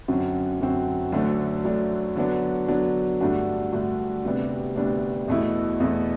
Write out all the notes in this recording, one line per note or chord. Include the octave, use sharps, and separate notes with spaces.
F#2 D3 F#3 C4 F#4
F#2 D3 F#3 C4 F#4
D2 D3 F#3 A3 D4
D2 D3 F#3 A3 D4
D3 F#3 B3 D4
D3 F#3 B3 D4
G2 D3 A3 D4 F#4
G2 D3 A3 D4 F#4
D2 C3 G3 B3 D4
D2 C3 G3 B3 D4
E2 B2 A3 E4
E2 B2 A3 E4